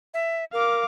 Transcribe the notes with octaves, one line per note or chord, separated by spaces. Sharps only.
E5
A#4 F5 D6